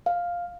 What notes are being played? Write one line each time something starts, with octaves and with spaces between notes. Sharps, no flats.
F5